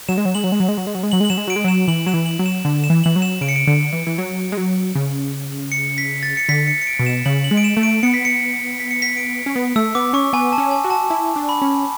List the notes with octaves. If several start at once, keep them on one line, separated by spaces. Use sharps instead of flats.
F#3 E7
G#3
F#3
G#3 F#7
F#3
G#3
F#3
G#3
F#3
G#3
F#3
G#3
F#3 F#7
G#3
F#7
F#3 E7
G#3
F#3 D7
G#3
F#3 E7
E3 F#7
F#3 E7
E3
F#7
F#3
E7
D3
E7
E3
E3 F#7
F#3
E7
C#3 D7
C#7
D7
D3
E3
E3
F#3
G#3
F#3
C#3
C#7
B6
A6
C#7
D3 B6
C#7
C#7
D7
B2
E7
C#3 F#7
F#7
G#3
D7
E7
A3
D7
B3 C#7
B6
C#7
B6
C#7
B6
D7
C#4
B3
A3 E6
B3 D6
C#4 C#6
B3 G#5
A5
C#4
G#5
F#4
A5
E4 A5
D4
B5
C#4